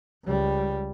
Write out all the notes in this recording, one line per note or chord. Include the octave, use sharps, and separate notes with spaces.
C#2 G3